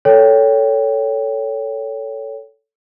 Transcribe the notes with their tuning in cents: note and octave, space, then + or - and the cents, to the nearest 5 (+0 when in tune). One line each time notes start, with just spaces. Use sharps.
A4 +5 C#5 +20 G5 +0